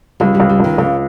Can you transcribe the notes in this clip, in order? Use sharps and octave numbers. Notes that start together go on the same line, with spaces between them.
C#2 G3
G3
C#2
G3
C#2 D#3
C#2 C#3